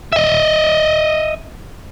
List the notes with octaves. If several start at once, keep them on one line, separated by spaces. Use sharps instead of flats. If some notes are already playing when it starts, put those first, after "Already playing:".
D#5 E5